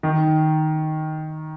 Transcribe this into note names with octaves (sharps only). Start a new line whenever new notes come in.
D#3